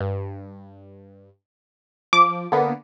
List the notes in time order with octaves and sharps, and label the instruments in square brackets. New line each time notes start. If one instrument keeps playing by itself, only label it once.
[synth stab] G2
[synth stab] F3 [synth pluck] D6
[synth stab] D3 A#3 B3